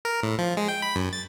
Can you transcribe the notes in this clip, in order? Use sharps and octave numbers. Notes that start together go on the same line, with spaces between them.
A#4
A2
F3
G#3
G5
B5
F#2
A6